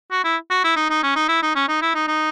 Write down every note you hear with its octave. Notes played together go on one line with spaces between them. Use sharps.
F#4
E4
F#4
E4
D#4
D#4
C#4
D#4
E4
D#4
C#4
D#4
E4
D#4
D#4